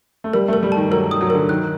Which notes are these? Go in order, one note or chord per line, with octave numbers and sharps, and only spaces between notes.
A3
G3 A#4
A3 A#4
G3
D#3 A5
F#3 A#4
D#6
F#3
D3 A#4
D#3 F#6